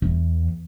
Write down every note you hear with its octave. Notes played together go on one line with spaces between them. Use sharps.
E2